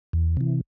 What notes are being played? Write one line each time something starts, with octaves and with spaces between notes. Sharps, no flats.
E2
C3 E3